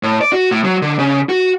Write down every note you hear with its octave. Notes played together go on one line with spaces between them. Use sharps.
A2
D5
F#4
A2
F#3
D3
C#3
F#4